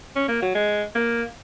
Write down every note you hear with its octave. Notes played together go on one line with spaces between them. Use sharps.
C#4
A#3
F#3
G#3
A#3